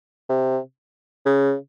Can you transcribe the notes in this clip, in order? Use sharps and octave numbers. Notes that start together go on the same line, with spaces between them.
C3
C#3